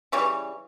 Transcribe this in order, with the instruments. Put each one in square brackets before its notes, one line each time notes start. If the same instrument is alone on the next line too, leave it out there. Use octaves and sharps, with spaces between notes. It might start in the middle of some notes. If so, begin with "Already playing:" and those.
[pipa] C#3 E3 G3 C#5